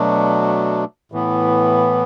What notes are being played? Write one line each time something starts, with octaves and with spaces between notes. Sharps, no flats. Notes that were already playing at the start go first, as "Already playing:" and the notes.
Already playing: B2 F#3 A3 D4
A2 E3 B3